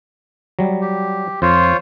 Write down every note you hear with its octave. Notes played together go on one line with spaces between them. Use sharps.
F#3 G3
G4
F2 F4 C5 C#5